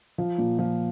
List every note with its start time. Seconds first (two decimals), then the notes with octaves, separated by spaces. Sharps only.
0.18 F3
0.38 A#2
0.59 F3